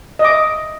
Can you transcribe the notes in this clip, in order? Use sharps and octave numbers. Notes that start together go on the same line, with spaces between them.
D#5
D6
E5